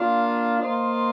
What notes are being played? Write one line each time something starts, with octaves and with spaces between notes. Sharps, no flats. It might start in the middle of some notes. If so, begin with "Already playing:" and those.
Already playing: A#3 D4 F4
A#3 F4 C5 D#5